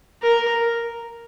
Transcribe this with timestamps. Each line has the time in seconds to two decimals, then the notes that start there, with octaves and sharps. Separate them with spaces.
0.22 A#4